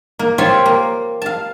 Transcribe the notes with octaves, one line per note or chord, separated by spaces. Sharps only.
A#3
F4 G4 C5 C#5 E5 F5
A#3
F5 A5